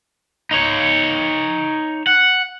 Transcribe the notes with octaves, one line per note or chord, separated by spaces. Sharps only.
D#4 C#5
F#5